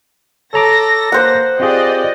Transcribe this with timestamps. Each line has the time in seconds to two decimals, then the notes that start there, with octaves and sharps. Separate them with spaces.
0.54 A4 C#5 A#5 D6 A#6
1.12 A#3 C5 F#5
1.60 C4 F4 G4 G#4 D5 D#5